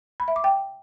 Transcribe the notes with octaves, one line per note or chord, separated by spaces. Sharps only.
B5
E5
D6
G5